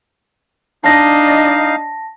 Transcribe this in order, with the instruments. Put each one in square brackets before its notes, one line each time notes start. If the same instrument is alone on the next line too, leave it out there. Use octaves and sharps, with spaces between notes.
[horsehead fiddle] D4 D#5 [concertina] D#4 F5 [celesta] A5 A#6